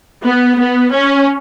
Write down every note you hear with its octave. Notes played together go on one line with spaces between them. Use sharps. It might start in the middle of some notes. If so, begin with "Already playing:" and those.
B3
B3
C#4